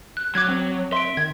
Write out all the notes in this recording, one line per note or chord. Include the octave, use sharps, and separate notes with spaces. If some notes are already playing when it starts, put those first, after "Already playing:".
F#6
F#3 D6 F#6 G#6
C4
E5 C6 D7
D#3 G#6